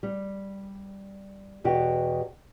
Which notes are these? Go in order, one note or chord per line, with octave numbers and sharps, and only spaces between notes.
G3
E2 B2 F#4 G4